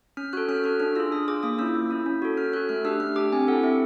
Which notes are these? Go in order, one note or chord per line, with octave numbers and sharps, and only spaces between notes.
C#4 F6
F#4 A4 F#6
C#4 F6
F#4 A4 F6
D4 F6
F4 G#4 E6
D4 D#6
F4 G#4 D6
A#3 D#6
C#4 E4 E6
A#3
C#4 E4
C#4
F#4 A4
C#4 F6
F#4 A4 F#6
A3 F6
D4 G4 E6
A3 F6
D4 G4 D6
C4 G#5
E4 A4 F#5
C4 E5